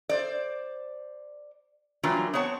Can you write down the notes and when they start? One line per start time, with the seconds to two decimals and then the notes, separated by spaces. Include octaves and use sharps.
0.09 C5 D5
2.03 E3 F#3 G3 A#3 D4 F4
2.34 B3 C4 C#5 F#5 A5